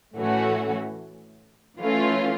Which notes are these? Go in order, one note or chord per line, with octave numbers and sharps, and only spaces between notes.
A2 E3 A3 C#4 F#4
E3 A3 C#4 F4